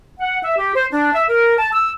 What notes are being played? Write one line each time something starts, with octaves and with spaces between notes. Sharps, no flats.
F#5
E5
G4
C5
D4
E5
A#4
A5
E6